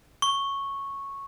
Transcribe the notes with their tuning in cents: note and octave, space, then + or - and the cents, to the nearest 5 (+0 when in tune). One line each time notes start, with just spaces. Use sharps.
C#6 -5